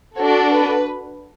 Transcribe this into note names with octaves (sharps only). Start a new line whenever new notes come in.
D4 F#4 A4 C#5
B4